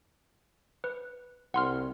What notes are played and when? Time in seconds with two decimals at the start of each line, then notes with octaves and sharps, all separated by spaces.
0.84 B4
1.54 C2 F#5 C6 F6